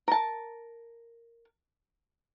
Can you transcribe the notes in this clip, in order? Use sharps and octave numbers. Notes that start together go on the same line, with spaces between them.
A#4 A5